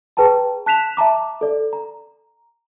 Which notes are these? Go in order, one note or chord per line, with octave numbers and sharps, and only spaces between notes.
G#4 B4 G5 A5 A#5
A5 F#6 B6 E7 F7
E5 A5 A#5 D6
A4 D5
A#5